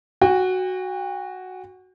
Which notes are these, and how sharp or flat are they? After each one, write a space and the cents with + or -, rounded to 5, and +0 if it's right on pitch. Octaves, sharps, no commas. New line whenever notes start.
F#4 +0 G5 +40